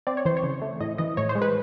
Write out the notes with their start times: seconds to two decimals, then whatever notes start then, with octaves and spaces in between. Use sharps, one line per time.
0.07 C4 D5
0.17 C#5
0.25 E3 C5
0.37 C#5
0.43 C#3
0.62 A3
0.80 A2 D#5
0.98 E3 D#5
1.17 A2 C#5
1.29 C5
1.35 G#3
1.42 B4